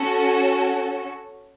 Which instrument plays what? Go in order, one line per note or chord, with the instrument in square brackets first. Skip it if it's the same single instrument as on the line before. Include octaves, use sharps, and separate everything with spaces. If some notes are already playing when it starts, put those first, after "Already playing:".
Already playing: [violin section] C#4 F#4 A4